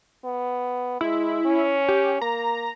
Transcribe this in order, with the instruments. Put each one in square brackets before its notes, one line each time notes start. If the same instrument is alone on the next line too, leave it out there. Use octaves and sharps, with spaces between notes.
[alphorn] B3
[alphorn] G#3 [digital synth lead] E4
[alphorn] C#4
[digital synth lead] G4
[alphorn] A#3 [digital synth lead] A#5